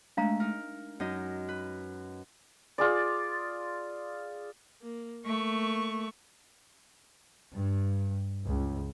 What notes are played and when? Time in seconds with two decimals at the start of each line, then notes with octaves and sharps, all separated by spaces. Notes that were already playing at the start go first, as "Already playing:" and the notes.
0.17 G#3 A3 D4 F5 A#5
0.40 D#4 A#4
1.00 F#2 D#4 D#5
1.49 B4
2.78 F4 G#4 D5
4.82 A#3
5.26 A3 A#3 C#6
7.52 G2
8.44 C#2